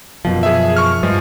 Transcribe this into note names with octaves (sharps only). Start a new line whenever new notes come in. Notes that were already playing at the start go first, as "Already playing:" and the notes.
F#2 B2 F3
G#4 E5
C#6 F6
G2 F3 G#3